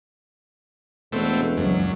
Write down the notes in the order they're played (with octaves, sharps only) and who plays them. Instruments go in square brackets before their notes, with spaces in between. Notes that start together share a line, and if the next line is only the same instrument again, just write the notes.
[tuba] E1 [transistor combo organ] B2 A3 C4
[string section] C#2 F#3 [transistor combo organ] F#2